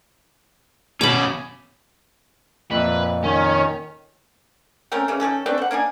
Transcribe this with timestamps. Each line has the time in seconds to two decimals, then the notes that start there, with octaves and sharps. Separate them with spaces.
1.01 B2 C#4 B5 D6
2.71 F2 A#2 B4 E5
3.23 D#3 C#4
4.92 A3 C4 C#4 A#4
5.08 C#3 E3
5.20 D#3 F3 C#4 A4
5.46 A3 C4 D4 B4
5.58 C5 F#5
5.71 A#3 D4 D#4 G#5